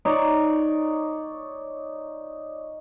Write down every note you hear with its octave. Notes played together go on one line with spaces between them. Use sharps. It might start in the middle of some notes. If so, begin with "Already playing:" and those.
D#4 C#5 D5